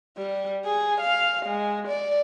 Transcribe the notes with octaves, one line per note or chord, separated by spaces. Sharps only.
G3
G#4
F5
G#3
D5